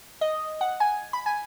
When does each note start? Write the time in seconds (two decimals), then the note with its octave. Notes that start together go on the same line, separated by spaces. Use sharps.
0.21 D#5
0.61 F#5
0.80 G#5
1.13 B5
1.26 G#5